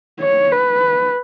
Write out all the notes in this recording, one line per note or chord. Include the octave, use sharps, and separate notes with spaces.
C#5
B4